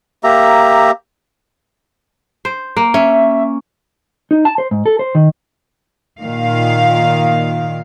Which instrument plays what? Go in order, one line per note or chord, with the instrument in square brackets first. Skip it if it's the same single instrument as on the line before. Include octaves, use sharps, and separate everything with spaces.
[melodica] A#3 G4 E5 A#5
[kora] C5
A#3
[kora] C#4 [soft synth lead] E5
[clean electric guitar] D#4
A5
C5
G#2
A4
C5
D#3
[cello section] A#2 D#3 F5